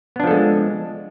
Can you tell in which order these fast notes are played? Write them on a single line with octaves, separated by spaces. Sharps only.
B3 D4 F3 A4 G#3